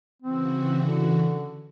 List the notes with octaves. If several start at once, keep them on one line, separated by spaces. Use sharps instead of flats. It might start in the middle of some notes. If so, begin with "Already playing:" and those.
C#3 E3 C4 F#4
D3